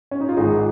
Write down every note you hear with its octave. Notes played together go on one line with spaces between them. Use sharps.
C#4
D#4
F4
G#1 G#2 F3 D#4 G#4